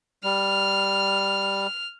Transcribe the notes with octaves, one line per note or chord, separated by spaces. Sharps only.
G3 F6